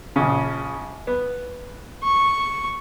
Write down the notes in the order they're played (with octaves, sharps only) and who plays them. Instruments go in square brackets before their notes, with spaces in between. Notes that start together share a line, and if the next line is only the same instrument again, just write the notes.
[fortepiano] A#1 C#3
B3
[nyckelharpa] C#6